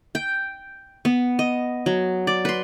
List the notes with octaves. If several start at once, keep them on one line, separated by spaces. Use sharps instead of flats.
G5
B3
D#5
F#3
D5
B4 C6